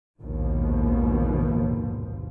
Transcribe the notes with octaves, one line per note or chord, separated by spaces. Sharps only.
F1 A#1 D#2 G#2 B2 F3